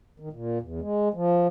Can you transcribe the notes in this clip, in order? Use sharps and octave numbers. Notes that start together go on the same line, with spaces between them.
D#3
A#2
E2
G#3
F3